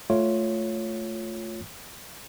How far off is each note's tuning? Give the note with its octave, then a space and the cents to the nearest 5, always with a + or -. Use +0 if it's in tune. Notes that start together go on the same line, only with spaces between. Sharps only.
A3 +0 F4 +0 C#5 +0